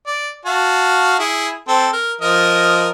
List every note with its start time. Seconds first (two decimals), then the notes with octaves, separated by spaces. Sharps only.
0.07 D5
0.46 F#4 F5 A5
1.19 E4 G#4
1.68 C4 A4
1.93 A#4
2.21 F3 A#4 D#5